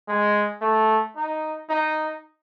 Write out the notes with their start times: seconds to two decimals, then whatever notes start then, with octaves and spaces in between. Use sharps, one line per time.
0.08 G#3
0.61 A3
1.16 D#4
1.69 D#4